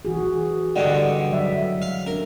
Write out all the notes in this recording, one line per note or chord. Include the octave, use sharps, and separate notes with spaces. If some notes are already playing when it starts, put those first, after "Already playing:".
E3 F#4 G#4
G2 D3 G3 D5 D#5 F#5
F#3 E5
F5
C#4 D4 A#4